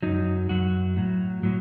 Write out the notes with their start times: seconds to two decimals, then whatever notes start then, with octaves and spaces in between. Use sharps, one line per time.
0.03 F#2 F#3 D#4
0.49 F#2 F#3 F#4
0.96 A2 F#3
1.43 A2 F#3